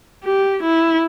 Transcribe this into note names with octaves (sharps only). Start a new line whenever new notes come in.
G4
E4